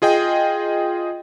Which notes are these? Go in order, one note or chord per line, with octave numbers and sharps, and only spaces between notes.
F4 G#4 D#5 G5